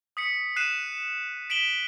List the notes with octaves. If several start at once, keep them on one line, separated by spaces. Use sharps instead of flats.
D#6 B6 C#7
F#6 C7 D#7 E7
B6 D7 E7 F#7 G7